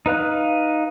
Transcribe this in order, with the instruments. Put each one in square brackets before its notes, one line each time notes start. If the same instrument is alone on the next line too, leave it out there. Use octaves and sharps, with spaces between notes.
[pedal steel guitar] D#4 B4 F5 F#6